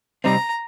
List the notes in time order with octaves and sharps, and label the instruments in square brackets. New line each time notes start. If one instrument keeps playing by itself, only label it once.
[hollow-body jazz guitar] C3 G3 C4 D#4 [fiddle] A#5